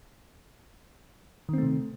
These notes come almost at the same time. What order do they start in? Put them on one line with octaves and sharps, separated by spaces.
D#3 C4 A3 C3